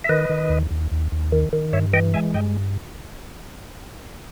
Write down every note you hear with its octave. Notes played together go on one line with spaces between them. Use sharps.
E5
D#3 B4 D#5
D#3
D#2
D#2
D#2
D#2
D#3
D#3
G2 C#5 E5
E3 D#5 G5
G#3 E5 G#5
G2 D#5 G5